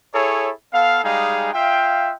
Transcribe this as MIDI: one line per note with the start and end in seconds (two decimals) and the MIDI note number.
0.13 0.49 64
0.13 0.49 68
0.13 0.49 69
0.13 0.49 73
0.72 1.02 59
0.72 1.02 69
0.72 1.02 77
1.03 1.49 55
1.03 1.49 56
1.03 1.49 63
1.03 1.49 68
1.03 1.49 77
1.53 2.12 65
1.53 2.12 76
1.53 2.12 77
1.53 2.12 79